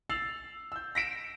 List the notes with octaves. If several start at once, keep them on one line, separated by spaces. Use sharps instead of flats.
E6 A6 C7 F7 F#7
E6 G6
A#6 B6 D7 E7